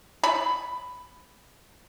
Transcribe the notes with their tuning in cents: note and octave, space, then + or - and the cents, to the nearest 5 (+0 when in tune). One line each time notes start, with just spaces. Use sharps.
B5 +5